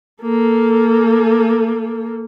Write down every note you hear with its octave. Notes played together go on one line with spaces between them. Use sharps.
A#3 A4